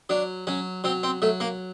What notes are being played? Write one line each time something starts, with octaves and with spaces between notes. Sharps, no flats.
F#3 D4
F#3 C#4
F#3 C4
C4
F#3 A3
A#3